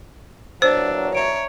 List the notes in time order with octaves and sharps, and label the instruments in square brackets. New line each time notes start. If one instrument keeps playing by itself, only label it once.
[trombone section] E2 A#2 F#3 [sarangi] D4 [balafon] C5 [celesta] E6 A6
[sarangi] C#5 [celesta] E5 A#5 D7